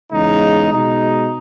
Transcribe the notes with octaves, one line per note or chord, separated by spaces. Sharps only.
E2 C#3 G#3 D#4
B2 G#3 D#4